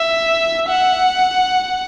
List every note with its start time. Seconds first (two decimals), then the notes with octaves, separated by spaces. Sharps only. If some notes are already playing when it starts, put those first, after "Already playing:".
Already playing: E5
0.69 F#5